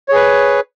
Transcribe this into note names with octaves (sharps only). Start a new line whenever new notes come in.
G#4 B4 C#5